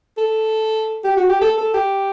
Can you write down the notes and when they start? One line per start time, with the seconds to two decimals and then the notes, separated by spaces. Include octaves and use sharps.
0.18 A4
1.04 G4
1.17 F#4
1.29 G4
1.42 A4
1.58 A4
1.74 G4